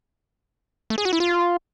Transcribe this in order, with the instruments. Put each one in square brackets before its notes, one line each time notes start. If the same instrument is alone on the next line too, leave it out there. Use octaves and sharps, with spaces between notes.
[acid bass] A3
G#4
F#4
E4
F4